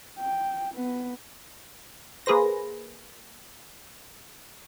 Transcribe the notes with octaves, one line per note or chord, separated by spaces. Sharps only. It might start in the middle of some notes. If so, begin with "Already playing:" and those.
G5
B3
A#3 G#4 B4 C5 A#6